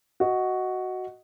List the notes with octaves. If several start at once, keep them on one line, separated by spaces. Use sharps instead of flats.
F#4 D#5